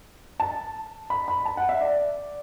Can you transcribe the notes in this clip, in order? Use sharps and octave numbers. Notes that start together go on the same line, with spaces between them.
A5
B5
B5
A5
F#5
E5
D5